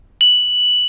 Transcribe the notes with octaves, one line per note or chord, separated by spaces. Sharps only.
F#7